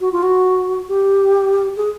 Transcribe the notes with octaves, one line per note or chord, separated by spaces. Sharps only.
F#4
F4
F#4
G4
G#4